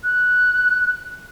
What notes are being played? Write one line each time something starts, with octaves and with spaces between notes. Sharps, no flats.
F#6